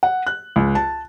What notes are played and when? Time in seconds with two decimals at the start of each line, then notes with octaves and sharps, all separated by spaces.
0.03 F#5
0.27 F#6
0.56 C#2
0.75 A5